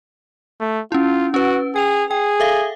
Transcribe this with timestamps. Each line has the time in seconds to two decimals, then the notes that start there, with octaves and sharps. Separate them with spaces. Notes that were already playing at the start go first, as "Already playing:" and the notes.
0.60 A3
0.92 C#4 E4 F4
1.34 C#4 F#4 B4
1.76 G#4 G5 F7
2.11 G#4 G5
2.40 A4 E5 F5